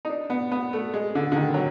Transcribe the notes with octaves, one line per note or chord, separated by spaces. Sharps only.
D#4
D4
B3
B3
A3
G#3
D3
D3
D#3
F#3